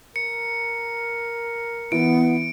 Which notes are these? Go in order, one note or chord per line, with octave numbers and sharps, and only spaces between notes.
A#4 C#7
E3 B3 D7